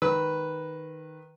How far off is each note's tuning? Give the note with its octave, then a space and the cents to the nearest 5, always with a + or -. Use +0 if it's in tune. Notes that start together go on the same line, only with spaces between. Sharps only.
D#3 +0 B4 +0 E6 -10